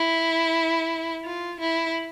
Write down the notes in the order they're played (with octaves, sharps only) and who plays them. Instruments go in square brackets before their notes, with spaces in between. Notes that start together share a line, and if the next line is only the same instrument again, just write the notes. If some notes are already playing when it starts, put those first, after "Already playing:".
Already playing: [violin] E4
F4
E4